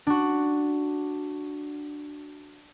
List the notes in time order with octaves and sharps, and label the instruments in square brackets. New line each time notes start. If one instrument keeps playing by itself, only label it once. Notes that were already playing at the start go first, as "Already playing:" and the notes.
[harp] D4 F#4